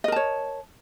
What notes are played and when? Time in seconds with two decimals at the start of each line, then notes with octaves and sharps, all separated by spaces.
0.04 D#5
0.08 A#4
0.12 A5
0.16 C#5